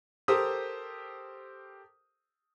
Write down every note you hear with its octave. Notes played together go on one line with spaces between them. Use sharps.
G4 A4 A#4 C5 D#6